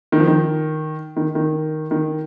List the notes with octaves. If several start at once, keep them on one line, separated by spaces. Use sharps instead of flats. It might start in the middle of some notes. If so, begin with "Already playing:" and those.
D#3
F3
D#3
D#3
D#3
D#3